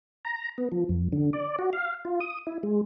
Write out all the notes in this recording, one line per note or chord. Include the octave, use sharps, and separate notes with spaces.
A#5
B3
F3
F2
D3
D5
F#4
F5
F4
D#6
E4
G#3